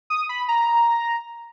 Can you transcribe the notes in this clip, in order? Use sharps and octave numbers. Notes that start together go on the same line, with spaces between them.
D#6
B5
A#5